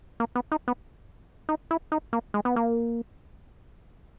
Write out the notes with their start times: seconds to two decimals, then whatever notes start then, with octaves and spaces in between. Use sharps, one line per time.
0.20 A#3
0.35 B3
0.52 D#4
0.68 B3
1.49 D#4
1.71 E4
1.92 D#4
2.13 A#3
2.34 G#3
2.45 B3
2.56 A#3